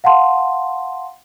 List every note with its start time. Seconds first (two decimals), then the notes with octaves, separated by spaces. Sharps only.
0.04 F5 F#5 A5 C6